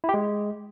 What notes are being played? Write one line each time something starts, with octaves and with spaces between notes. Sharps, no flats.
E4
G4
G#3